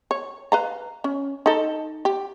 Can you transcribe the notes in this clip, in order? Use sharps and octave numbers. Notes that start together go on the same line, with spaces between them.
C#5
B4 F5 A#5
C#4
D#4 A4
G4